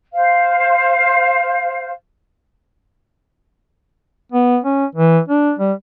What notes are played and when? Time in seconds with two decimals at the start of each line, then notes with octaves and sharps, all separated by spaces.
0.13 C5 F5
4.32 B3
4.64 C#4
4.95 E3
5.28 D4
5.59 G3